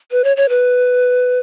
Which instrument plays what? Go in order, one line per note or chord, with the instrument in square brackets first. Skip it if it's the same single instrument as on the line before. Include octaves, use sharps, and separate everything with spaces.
[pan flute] B4
C#5
C#5
B4